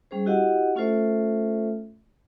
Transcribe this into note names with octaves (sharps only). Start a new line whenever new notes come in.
G3 C#4 G#4 C5
E4 F#4 G4 D#5 F5 F#5
A3 C#4 F4 A4 C5 E5